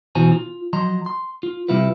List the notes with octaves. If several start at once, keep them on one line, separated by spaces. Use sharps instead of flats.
B2 E3 F#4 C5 G#5 A#5
F4
F3 F#3 D#5 A#5 C6
C6
F4
C3 G3 E4 F4 B4